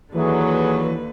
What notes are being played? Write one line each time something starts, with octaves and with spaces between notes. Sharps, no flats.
D#2 D3 E3 F#3 G#4 B4